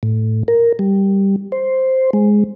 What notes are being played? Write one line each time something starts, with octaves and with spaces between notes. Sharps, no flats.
A2
A#4
G3
C5
G#3